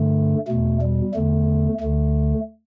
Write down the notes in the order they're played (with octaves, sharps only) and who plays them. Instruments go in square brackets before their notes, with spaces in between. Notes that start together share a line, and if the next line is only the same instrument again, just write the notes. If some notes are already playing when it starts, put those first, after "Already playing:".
Already playing: [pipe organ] G2 D3 A3
E2 B2 A3
G3
E2 D3 A3
D2 D3 A3